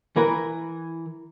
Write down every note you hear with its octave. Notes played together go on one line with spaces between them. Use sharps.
E3 A#4 B4